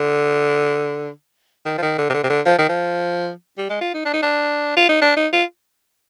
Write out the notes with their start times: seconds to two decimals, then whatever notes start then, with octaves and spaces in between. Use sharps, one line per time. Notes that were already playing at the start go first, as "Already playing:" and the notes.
Already playing: D3
1.66 D#3
1.78 F3
1.82 D#3
1.98 D3
2.10 C3
2.14 D3
2.23 C3
2.30 D3
2.46 F3
2.58 D#3
2.69 F3
3.58 G3
3.70 G#3
3.81 F4
3.94 D#4
4.05 D4
4.14 D#4
4.23 D4
4.77 F4
4.89 D#4
5.02 D4
5.17 D#4
5.33 F4